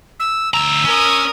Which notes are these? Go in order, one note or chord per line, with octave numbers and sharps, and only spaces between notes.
E6
D2 A#5 E6
C#4 A#4 D#6